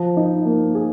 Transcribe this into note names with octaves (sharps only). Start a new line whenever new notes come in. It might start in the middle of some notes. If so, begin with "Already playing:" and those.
Already playing: F3
D#4
A#3
G#4